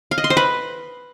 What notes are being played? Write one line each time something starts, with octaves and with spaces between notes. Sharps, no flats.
F5
D#5
C6
C5
B4